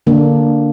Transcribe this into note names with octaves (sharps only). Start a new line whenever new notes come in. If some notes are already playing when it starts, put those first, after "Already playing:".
D3 A#3 D4